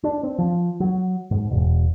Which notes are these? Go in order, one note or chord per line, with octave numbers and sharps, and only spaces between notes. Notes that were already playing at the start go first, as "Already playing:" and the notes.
D4
C4
F3
F#3
G#2
E1